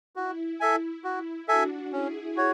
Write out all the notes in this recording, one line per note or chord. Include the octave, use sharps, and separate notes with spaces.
E4 F#4
A4 E5 G#5
E4 F#4
D4 F#4 A4 E5 G#5
C#4 E4 G#4
F#4 C#5